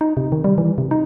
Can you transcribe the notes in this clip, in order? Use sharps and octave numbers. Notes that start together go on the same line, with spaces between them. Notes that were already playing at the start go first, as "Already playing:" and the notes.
D#4
C3
D#3
G3
E3
C3
D#4